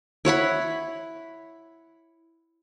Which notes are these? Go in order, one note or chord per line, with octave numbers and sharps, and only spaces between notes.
E4 C#5 F#5 B5